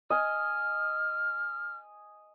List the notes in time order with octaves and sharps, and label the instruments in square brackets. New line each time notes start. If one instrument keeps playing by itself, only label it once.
[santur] D#5 G#5 [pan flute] F6